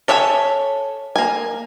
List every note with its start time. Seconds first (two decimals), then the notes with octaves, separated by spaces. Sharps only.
0.08 A4 C#5 E5 F5 G#5
1.16 A#3 G#5